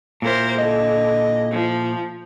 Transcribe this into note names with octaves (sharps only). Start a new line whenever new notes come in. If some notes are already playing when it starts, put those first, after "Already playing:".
A#2 E4 A#4 C5
D3 D#5
F3